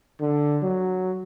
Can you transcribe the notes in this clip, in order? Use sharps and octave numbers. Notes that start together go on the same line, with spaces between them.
D3
F#3